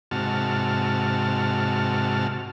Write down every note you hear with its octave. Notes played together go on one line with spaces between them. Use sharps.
G#2 C3 F#4 A5 F6